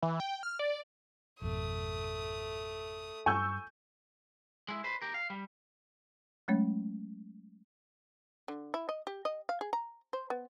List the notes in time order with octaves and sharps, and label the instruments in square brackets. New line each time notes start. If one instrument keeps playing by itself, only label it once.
[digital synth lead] E3
G5
F6
D5
[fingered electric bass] G#1 F2 B2 [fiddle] A3 D#6
[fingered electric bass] G2 [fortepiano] G#5 [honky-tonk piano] C#6 E6 G6
[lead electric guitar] G#3 E4
B4 C5
G4 A#4
F5
G3
[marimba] F#3 G#3 A3 C#4 C#5
[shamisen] D3
E4
D#5
G4
D#5
F5
G#4
A#5
C5
B3